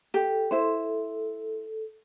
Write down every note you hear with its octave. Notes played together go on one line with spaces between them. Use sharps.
G4 A4
E4 C5